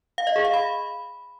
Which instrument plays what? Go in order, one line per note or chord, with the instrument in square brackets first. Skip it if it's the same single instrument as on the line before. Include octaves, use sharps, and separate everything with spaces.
[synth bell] F5
D#5
G#4
F5
B5